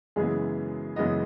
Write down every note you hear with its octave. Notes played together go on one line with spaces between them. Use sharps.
F#2 C#3 E3 G#3 B3 G#4
F#2 C#3 E3 G#3 B3 D#5